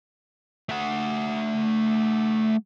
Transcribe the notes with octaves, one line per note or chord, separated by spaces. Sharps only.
A3 F#5